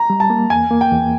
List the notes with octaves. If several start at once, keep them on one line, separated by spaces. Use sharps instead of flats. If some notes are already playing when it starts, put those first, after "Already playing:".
Already playing: A#5
G3
A5
A#3
E2 G#5
A#3
G5
E2